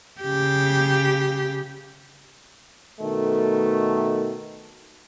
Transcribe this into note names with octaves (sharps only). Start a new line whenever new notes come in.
C#3 G4
B2 D#3 A3